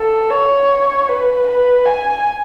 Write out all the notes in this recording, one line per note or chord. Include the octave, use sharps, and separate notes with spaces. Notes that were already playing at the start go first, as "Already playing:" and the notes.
Already playing: A4
C#5
B4
B4
G#5